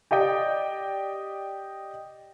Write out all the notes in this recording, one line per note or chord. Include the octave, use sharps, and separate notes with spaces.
G4 D5 D#5 G5